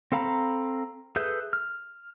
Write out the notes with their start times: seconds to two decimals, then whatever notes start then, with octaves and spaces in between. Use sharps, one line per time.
0.12 C4 A4 F5 A#5 B5
1.16 G#4 A4 B4 E5 G6
1.53 F6